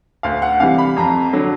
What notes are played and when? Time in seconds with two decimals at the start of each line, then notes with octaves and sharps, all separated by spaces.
0.23 D2 F5
0.42 F#5
0.60 C3 E3 G3 F5
0.78 B5
0.97 F2 A#5
1.33 D3 F#3